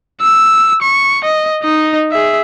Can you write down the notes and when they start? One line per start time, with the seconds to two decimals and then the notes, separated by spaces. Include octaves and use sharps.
0.21 E6
0.82 C#6
1.25 D#5
1.64 D#4 D#5
2.12 G#4 E5